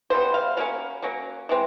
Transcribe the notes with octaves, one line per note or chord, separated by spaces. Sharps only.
C#3 E3 G3 B3 C5
F5
F#3 A#3 C#4 F5
F#3 A#3 C#4
E3 G#3 C4